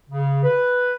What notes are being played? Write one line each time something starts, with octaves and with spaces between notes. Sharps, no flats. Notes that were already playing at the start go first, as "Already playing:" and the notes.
C#3
B4